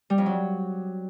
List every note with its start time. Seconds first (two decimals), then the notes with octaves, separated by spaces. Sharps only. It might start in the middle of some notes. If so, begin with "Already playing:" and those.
0.10 G3
0.18 F2
0.26 F#3